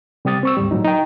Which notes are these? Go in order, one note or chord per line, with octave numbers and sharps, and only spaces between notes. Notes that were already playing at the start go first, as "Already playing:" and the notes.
C3 G3 G4 D#6 A6
C4 C#6 E6
D2 G#2 G3
A2 F#3 D#4
D#4 G5